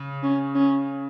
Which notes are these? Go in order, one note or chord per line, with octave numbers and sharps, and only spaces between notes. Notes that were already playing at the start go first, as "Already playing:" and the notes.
Already playing: C#3
C#4
C#4